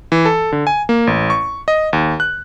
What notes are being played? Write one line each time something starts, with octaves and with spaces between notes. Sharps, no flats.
E3
A4
D3
G#5
A#3
A1
C#6
D#5
D#2
F#6